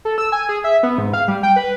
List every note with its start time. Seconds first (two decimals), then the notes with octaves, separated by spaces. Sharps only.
0.05 A4
0.18 E6
0.32 G#5
0.49 G#4
0.64 E5
0.83 B3
0.98 G#2
1.13 F5
1.28 G3
1.43 G5
1.56 B4